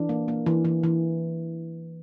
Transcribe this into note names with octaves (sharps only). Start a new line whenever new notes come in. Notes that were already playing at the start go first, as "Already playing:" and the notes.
Already playing: E3 D4
A#3
A#3
E3
E3
E3